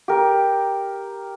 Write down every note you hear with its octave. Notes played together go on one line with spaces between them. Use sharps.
G4 A#4